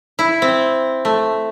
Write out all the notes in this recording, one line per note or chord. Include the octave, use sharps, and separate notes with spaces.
E4
C4
A3